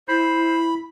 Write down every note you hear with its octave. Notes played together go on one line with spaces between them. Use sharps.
E4 C5 B5